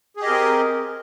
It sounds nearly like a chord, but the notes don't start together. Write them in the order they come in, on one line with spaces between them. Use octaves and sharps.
G#4 G4 D#5 A#4 C4